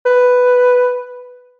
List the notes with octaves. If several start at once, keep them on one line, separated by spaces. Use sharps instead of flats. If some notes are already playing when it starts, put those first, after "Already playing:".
B4